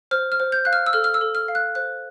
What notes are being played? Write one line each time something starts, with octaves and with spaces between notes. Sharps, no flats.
C5 F6
F6
C5
G6
F5 F#6
F6
E6
A4 F6
F6
E6
A4
F6
F5
F#6
C5 F#6